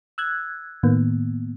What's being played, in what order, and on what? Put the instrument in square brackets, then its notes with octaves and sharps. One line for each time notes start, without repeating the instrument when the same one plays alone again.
[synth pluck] E6 F#6 G#6
A2 D#3 A#3 B3